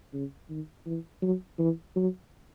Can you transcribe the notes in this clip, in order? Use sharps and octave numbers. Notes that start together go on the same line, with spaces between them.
C#3
D#3
E3
F#3
E3
F#3